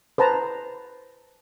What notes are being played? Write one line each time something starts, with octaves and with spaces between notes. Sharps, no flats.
B4 C5 A5 A#5